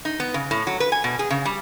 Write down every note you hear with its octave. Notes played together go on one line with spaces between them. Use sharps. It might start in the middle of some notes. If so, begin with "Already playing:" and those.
D#4
B3
C#3
A2
F#3
B4
G#5
B2
G#4
C#3
G3